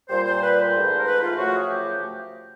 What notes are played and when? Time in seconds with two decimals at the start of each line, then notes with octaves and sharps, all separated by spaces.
0.09 A#2 G3 C5
0.26 C5
0.41 B4
0.58 C5
0.73 G#2 E3 A3
0.99 A#4
1.05 B4
1.21 F4
1.37 F#2 C#3 F3 A3 F#4
1.54 G#4
1.69 G4